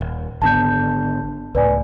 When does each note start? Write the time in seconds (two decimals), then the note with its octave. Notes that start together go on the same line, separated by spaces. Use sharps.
0.01 D#1
0.42 G#1 D3 B3 A5 G6
1.55 C#2 A2 B4 D5 G#5